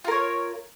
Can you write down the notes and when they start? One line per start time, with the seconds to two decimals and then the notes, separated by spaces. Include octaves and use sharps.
0.05 F4
0.08 A#4
0.11 C#5